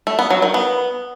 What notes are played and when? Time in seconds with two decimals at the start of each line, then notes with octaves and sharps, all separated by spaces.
0.07 A3
0.19 B3
0.30 F#3
0.42 D#3
0.54 B3